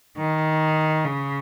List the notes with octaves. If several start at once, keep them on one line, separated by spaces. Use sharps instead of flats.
D#3
C#3